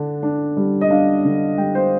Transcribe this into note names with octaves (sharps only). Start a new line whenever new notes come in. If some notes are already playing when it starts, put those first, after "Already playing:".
Already playing: D3 D4
D4
G3
D#5
D4 F5
D3
G3 G5
C5